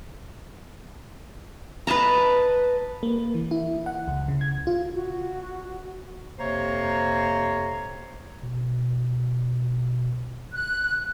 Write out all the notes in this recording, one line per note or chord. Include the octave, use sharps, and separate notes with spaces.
B4 D#5 A5 A#5
A#3
E3
E4
F#5
C#2
C#3
G#6
F4
F#4
F2 C3 A#3 C5 C#5 A#5
B2
F#6